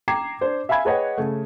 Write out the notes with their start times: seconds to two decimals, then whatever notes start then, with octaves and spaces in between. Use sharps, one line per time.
0.08 G5 A#5 D6 G#6 C7 E7
0.41 D4 C5
0.69 E5 F5 G#5 B5 G#6
0.85 G#4 B4 C#5 D#5 F#5 G5
1.18 C#3 A3